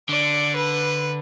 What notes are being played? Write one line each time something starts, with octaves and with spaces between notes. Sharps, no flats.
D3 D5
B4